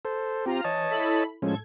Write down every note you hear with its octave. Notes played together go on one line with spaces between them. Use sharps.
A4 C5
C4 F4 G4 A#5 F6
E3 C#5 D#5 A5
E4 A4 B5
A2 F3 G#3 C#4 A4 G#6